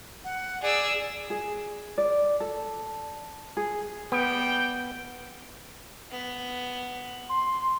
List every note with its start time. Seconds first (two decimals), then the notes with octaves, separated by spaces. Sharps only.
0.24 F#5
0.62 G#4 D5 E6
1.30 G#4
1.98 D5
2.40 A4
3.57 G#4
4.12 G3 B3 G5
6.11 B3
7.29 C6